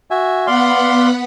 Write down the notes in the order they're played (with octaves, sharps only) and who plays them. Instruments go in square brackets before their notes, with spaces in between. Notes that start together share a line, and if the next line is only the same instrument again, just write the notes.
[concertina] F#4 E5 G#5
[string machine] B3 F#5 B5 [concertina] D5 F5 C6